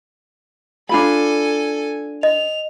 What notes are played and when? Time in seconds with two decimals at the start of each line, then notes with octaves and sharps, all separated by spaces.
0.89 D4 F4 A4 G#5 B5
2.23 D#5 F7